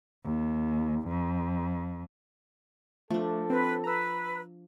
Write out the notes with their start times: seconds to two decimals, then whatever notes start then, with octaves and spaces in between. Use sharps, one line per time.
0.24 D#2
1.08 F2
3.10 F3 A3 D4 A4
3.50 C4 B4
3.84 B4 A#5 E6